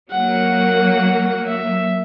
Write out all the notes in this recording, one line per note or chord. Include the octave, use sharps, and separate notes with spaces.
F#3 A#3 F#5
E5